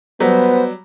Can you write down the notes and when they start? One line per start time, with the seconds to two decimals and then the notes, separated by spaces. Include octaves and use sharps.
0.20 F#3 G3 B3 C5